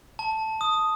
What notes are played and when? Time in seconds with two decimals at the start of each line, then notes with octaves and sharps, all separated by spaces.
0.19 A5
0.61 D#6